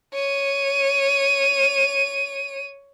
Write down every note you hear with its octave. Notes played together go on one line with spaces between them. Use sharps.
C#5 D#7